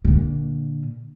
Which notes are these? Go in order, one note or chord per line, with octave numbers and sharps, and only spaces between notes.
A#2 D3